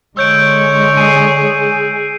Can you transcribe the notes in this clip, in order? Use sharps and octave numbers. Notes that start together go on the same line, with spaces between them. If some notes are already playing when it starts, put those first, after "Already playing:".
D3 G#3 C#5 E6 G6 D7
G#4 C7 D#7